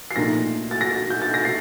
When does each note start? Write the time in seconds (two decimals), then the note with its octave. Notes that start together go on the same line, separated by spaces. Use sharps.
0.11 C7
0.16 A#1 A#2 A3 D#4 A#6
0.71 A6
0.81 A#6
1.10 G6
1.22 A6
1.34 A#6
1.45 A3 D4 C7